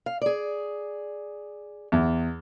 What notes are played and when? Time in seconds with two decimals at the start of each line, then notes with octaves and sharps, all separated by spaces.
0.06 F5
0.21 G#4 D5
1.92 E2